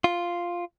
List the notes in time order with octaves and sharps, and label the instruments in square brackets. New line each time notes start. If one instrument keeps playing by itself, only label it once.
[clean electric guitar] F4